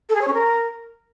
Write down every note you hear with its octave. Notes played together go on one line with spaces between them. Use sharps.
A4
G#4
C#5
C#4
A#4